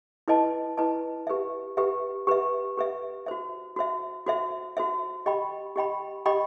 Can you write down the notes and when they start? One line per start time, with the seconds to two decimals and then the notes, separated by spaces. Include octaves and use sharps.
0.28 E4 B4 D#5 A5
0.78 E4 B4 D#5 A5
1.27 G4 B4 E5
1.77 G4 B4 E5
2.27 G4 B4 E5
2.77 G4 B4 E5
3.26 F#4 C5 E5
3.76 F#4 C5 E5
4.27 F#4 C5 E5
4.77 F#4 C5 E5
5.26 G4 D#5 G5 B5
5.76 G4 D#5 G5 B5
6.26 G4 D#5 G5 B5